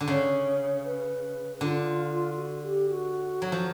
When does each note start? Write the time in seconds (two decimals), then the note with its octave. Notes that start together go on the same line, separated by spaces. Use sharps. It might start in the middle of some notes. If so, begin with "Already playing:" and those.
0.01 D3
0.08 C#3 C#5
0.85 B4
1.61 D3 F4
2.37 F#4
2.63 G4
2.89 F#4
3.42 F#3
3.52 F3